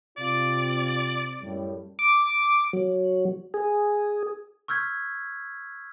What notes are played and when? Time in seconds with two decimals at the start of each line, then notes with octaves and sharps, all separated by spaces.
0.18 C3 C4 F4 D5
1.41 F#2 A2 G3
1.99 D6
2.73 F#3
3.54 G#4
4.68 C#6 E6 F6 G6 G#6 B6